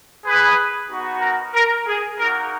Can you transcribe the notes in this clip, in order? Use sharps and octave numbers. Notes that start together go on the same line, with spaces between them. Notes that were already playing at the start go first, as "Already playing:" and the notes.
G#4 B4
B3 D#4 F#4
A#4
A#4
G#4
A#3 D#4 F#4 A#4